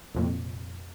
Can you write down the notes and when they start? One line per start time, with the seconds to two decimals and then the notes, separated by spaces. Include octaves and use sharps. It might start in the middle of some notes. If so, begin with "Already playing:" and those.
0.15 C2 F2 A#2